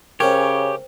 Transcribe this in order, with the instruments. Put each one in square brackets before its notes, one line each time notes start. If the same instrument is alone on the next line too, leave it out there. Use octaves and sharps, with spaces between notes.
[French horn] C#3 [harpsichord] C#4 A#4 [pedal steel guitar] G4 C#5 [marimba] C5 G5